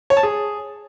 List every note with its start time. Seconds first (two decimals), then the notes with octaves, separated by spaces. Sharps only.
0.10 C#5
0.17 A5
0.23 G#4